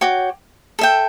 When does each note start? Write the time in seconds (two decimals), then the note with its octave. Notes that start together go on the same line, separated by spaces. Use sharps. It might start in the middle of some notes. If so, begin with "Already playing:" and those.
0.01 F#4 C#5 G5 D6
0.79 A4 E5 G5